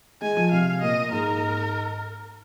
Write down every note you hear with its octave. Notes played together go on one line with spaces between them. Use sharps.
G#3 G#5
F3
C3 F5
A#2 D#5
G#2 A#4